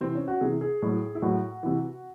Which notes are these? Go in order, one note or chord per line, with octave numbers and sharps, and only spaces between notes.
C3 E3 C4
C#4
F#4
C3 E3 G#4
G#4
A2 F#3
E4
A2 F#3 F#4
C3 E3